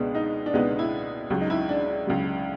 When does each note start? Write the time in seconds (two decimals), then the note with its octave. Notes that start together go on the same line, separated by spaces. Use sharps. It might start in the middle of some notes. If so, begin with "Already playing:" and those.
Already playing: C#2 B2 G#3 B3 D4
0.15 D#4
0.46 D4
0.53 C#2 B2 G#3 B3 D#4
0.79 E4
1.30 C#2 C#3 F#3
1.41 D#4
1.50 E4
1.69 D4
1.88 D4
2.07 C#2 C#3 F#3